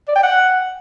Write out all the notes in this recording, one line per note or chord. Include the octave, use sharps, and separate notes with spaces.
D5
G5
F#5